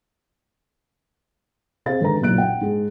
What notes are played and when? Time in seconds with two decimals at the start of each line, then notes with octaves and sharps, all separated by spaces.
1.86 C3 G#4 C5 F5 A6
2.01 G#1 D3 A4 B4 A#5
2.21 F#1 B1 A#2 F#6 D7
2.38 F#5 G5
2.61 G#2 G#4